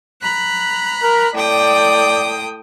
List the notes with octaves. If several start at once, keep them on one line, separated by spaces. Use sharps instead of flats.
A#5 B5 F#6
A#4
A2 D5 G5 D#6